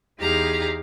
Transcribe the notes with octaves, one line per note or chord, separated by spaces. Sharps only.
E2 D#4 G4 G#4 F5 A#5